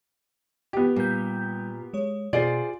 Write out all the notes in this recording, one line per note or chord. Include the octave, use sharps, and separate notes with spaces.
B3 G4
A#2 G3 G6
G#3 C#5
B2 F4 G#4 C5 D5